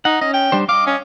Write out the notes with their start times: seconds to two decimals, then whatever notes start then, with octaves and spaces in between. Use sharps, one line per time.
0.05 D#4 F#5
0.21 C#4 D#5
0.34 G5
0.52 G3 D4 C5
0.69 D#5 F5 D6
0.87 C#4